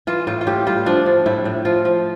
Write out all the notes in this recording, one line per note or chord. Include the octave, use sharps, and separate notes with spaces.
E3 F4
A2 F4
F4
A2 G4
G3 F4
F3 D4
F3
A2 E4
A2
F3 F4
F3